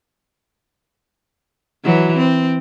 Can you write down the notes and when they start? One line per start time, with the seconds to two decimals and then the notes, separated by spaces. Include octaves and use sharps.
1.84 E3 F#3
2.17 C4